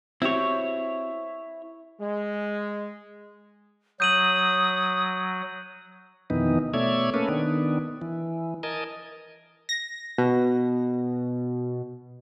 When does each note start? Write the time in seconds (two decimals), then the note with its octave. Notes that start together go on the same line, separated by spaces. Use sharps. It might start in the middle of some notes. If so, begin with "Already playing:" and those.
0.22 C4 E4 F#4 G4 C#5
2.00 G#3
4.00 F#3 D#6 G6 D#7 F#7
6.30 F2 B2 D#3 E3 B3 D#4
6.74 B2 A3 C#5 D5 E5 G#6
7.14 A3 A#3 C#4 A4 B4
7.29 D#3 B3 D4
8.02 E3
8.63 A#4 D#5 G#5 A5
9.69 A#6
10.18 B2